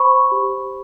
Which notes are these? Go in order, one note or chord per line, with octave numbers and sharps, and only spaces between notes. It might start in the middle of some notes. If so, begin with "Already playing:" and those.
Already playing: C5 B5 C#6
G4